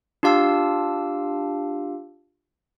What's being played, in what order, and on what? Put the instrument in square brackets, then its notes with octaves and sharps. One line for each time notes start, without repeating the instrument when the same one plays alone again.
[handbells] D4 F4 G4 F5 A5 E6